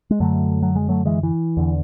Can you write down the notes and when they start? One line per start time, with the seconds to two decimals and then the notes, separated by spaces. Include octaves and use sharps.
0.11 G#3
0.20 F#2 D3 F#3 A3
0.62 F#3
0.76 G#3
0.89 F#3 A3
1.05 E3 G#3
1.23 E3
1.57 E2 D3